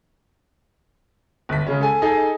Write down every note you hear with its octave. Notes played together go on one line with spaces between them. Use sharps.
G1 B6
C#3 G#3 C#4
A4 G#5
D#4 G#4 A4 D#5 G#5